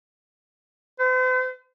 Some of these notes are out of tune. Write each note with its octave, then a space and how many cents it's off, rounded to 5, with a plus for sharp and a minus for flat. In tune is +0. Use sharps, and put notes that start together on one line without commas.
C5 -45